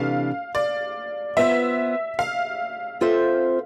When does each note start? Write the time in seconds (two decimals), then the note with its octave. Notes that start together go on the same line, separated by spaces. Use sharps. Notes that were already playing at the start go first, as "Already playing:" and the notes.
Already playing: C3 E3 A3 D4 F5
0.55 D5
1.37 B3 F4 C5 E5
2.19 F5
3.01 C4 F4 A4 C5 E5